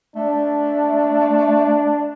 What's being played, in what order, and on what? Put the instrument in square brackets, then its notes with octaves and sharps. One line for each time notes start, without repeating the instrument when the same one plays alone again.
[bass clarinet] A3 [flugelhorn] D4